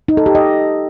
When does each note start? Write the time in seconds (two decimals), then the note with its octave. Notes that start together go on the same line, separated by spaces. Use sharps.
0.08 D#4
0.17 A4
0.26 G4
0.35 D#5